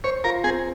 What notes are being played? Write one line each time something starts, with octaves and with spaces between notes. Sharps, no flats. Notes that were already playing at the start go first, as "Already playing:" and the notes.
C5 C#5
F4 A#4
C4 G#4